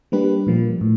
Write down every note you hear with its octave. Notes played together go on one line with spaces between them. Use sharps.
G3 A#3 D4 G4 B4
A#2 F3 A#3
A2